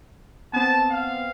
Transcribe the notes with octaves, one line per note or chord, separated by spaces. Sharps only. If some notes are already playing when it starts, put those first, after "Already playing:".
B3 C4 A5
F5